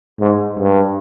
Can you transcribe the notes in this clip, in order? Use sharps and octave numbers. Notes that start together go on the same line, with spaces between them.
G#2
G2